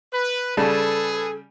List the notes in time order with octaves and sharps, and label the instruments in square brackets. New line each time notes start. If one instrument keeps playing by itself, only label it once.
[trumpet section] B4
[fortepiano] C#3 G3 A5 [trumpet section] G#4 B4 G#5 [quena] A4